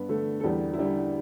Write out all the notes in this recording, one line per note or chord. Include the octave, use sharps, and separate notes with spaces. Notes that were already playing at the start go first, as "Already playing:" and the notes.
Already playing: G2 B3 B4
D3 A3 A4
A4
E2 G3 G4
E4
D3 G3 G4